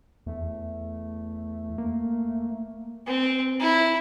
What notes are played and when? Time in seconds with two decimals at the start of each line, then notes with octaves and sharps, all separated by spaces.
0.26 E2 A3
1.78 A#3
3.06 C4
3.60 E4